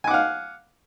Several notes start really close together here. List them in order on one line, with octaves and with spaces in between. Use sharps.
G#5 D6 F#5 F5